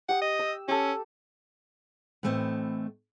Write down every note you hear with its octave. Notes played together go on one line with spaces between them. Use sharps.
G4 F#5 D#6
D#5
E6
C#4 G4 A4
A2 E3 A3 C4 D#5